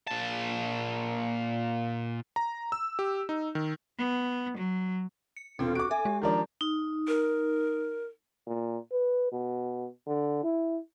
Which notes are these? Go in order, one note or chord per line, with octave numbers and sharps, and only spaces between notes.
A#2 A5
A#5
E6
G4
D#4
D#3
B3
F#3
C#7
E1 C4 F4 A4
F#4 D6 D7
A4 E5 G#5
G#3 G4
D#3 F3 D4 A#5
D#4
A#4
A#2
B4
B2
D3
E4